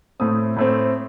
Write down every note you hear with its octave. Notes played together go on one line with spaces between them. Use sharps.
A2 A3 C4 D#6
A2 A3 C4